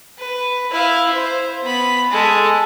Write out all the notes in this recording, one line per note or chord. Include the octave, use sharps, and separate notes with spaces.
B4
E4 F5
C5
B3 B5
G#3 A4